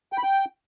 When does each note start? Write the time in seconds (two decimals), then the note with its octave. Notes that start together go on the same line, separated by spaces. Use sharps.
0.13 G5
0.18 B5
0.23 G5